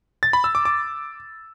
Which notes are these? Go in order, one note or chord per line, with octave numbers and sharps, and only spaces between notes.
A6
B5
E6
D6
D6